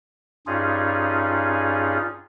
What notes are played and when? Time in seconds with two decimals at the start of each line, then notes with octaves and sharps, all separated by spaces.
0.47 G2 C#4 D#4 F4 G#4